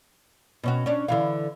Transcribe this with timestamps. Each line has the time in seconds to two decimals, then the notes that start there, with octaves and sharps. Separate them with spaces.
0.63 B2 C#4 F#4
0.86 C#4 D4
1.08 D3 E3 F5